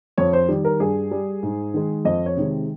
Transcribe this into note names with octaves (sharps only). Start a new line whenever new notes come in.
F2 C#5
C5
D#3 G3
A#4
G2 G#4
G3
G#2
D#3 G#3
F2 D#5
C#5
C3 D#3 G#3